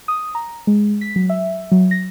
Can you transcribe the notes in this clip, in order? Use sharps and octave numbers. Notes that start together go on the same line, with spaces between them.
D#6
A#5
G#3
B6
F#3
E5
F#3
A#6